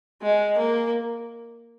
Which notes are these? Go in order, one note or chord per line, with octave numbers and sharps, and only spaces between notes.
G#3
A#3